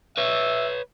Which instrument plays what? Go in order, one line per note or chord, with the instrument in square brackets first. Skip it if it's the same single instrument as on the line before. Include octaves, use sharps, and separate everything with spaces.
[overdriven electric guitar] B4 C#5 [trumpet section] E5